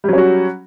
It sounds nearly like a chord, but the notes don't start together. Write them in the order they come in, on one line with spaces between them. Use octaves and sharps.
G3 F#3 C#4 F#4